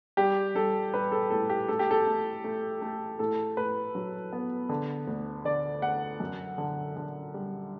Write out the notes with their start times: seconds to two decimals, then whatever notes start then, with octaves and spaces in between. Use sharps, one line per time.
0.17 G3 G4
0.55 G3 A4
0.94 G3 B4
1.12 A4
1.31 A2 A4
1.50 G4
1.68 A3 A4
1.79 G4
1.91 A4
2.06 A3
2.44 A3
2.82 A3
3.19 A2 A4
3.57 A2 B4
3.95 F#3
4.32 B3
4.69 D3
5.07 D2
5.45 D3 D5
5.82 A3 F#5
6.20 F#2
6.58 D3
6.96 D3
7.34 G3